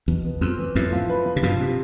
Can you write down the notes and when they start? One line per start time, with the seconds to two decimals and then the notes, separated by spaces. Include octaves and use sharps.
0.08 E2 B2
0.24 B3
0.41 F2 C4
0.58 E3
0.75 F2 A2 E4
0.93 F3
1.10 B4
1.26 F3
1.36 C3
1.43 G2 B2 F3
1.60 C3